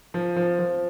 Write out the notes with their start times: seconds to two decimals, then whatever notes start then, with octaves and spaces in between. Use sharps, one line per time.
0.14 F3
0.36 F3
0.59 F3